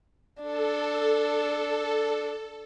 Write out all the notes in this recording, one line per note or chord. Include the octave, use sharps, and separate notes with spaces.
D4 A4